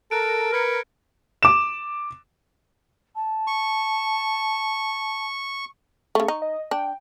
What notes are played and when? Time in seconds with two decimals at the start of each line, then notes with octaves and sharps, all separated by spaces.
0.11 A4 A#4 F#6 D7
0.53 B4 F6 G#6 C#7
1.43 D6 E7
3.15 A5
3.47 C#6
6.15 C#3 A3 C#6
6.28 D#4
6.42 D#5
6.71 D4 G5